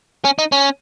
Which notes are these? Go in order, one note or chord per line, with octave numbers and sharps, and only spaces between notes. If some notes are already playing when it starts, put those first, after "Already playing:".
C#4
D#4
C#4